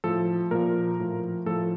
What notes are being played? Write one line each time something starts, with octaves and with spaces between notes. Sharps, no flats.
A2 F3 A4
A#2 F3 A#4
A2 F3
A2 F3 A4